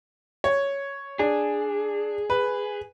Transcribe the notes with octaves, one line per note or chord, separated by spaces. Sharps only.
C#5
D4 G#4
B4